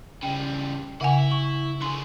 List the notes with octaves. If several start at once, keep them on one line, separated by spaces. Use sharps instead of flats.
C#3 G3 G5
C#3 E4 F#5 G#5
C#6
D3 G#4 C6